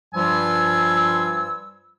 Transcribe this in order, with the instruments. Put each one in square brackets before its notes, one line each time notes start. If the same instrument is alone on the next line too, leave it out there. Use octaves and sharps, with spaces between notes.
[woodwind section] G2 F3 G3 F4 G#5 E6